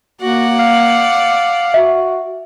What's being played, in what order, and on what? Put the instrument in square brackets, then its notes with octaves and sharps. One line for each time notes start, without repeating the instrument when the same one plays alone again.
[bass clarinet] A#3 [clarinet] F#4 [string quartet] D5 F#5
[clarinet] F5
[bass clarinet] F#4 [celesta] E5